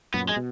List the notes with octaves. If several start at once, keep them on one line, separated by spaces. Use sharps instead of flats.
F#2 A#2 B3
G#3
B2